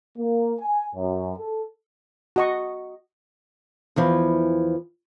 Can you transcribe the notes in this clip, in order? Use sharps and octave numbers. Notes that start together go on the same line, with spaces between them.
A#3
G#5
F#2
A4
F#4 D#5 C#6
E2 E3 F3